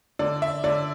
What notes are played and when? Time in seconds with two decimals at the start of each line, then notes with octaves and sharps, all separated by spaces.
0.19 D3 D5
0.42 E5
0.64 D3 D5